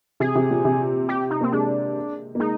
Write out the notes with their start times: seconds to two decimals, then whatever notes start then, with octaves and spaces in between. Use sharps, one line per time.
0.20 C3 G#4
0.35 C3
0.50 A#2
0.65 C3
1.09 G4
1.30 D#4
1.41 A#3 C4
1.52 G#3 D4
2.35 A#3
2.40 G#3 D#4